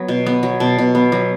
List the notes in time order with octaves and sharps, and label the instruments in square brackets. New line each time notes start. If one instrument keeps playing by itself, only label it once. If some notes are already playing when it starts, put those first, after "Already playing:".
Already playing: [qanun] F#3 B3 B5
B2
B3
F#3
B2 A5
B2
B3
F#3